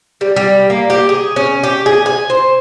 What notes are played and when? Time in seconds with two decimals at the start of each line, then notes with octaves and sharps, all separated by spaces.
0.21 G3
0.36 G3
0.70 A#3
0.90 G4
1.09 G#4
1.36 C#4
1.63 G4
1.86 G#4
2.06 G#5
2.30 C5